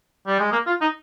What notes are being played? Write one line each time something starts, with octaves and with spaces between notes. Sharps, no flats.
G3
G#3
A#3
F4
D#4